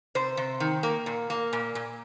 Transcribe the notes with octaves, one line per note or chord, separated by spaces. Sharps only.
C3 C5
C3
D#3
A#3
A#2
A#3
A#2
A#2